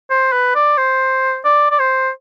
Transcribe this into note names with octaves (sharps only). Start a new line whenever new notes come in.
C5
B4
D5
C5
D5
D5
C5